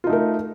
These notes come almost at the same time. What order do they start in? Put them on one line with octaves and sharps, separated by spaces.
F4 D#4 A3 A#4